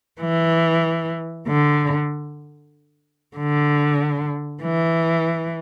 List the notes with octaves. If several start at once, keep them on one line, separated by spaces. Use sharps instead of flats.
E3
D3
D3
E3